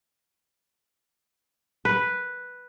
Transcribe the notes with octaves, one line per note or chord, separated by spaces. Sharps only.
B4